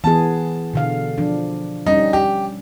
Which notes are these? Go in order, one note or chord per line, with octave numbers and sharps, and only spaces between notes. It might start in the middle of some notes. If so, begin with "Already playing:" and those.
E3 B3 G#4 A5
B2 D3 F5
F3 D4
G3 C#4 D#4
G4